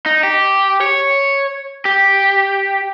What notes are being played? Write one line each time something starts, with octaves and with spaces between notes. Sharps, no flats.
D#4
G4
C#5
G4